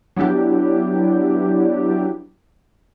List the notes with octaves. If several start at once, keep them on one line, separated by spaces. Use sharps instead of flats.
F#3 B3 D4 E4 G4